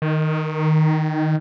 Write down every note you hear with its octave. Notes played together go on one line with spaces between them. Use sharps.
D#3